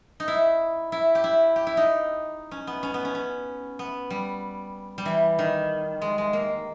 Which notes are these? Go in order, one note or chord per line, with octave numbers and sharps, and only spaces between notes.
D#4
E4
E4
G4
E4
G4
E4
D#4
C#4
B3
C#4
B3
C#4
C#4
B3
G3
G3
E3
D#3
G#3
G#3
A#3